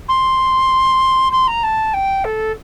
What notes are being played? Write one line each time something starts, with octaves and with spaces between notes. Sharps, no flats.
C6
C6
A#5
A5
G5
A4